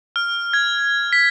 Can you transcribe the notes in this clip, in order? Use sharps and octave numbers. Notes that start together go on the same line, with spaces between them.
F6
G#6
B6